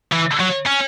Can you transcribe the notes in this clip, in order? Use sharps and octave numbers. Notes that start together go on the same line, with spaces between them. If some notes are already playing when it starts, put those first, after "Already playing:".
E3
F#3
C#4